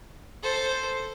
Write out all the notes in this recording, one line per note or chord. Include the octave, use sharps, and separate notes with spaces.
A4 C5